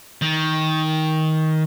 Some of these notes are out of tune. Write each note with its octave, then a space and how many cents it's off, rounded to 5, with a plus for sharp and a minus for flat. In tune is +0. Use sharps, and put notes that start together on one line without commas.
D#3 +15